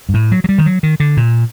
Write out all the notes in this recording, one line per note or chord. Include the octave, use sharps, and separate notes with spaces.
G2
A2
F#3
F#3
G3
D#3
F#3
D#3
D3
A#2